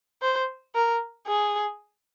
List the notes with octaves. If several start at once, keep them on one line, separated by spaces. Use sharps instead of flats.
C5
A#4
G#4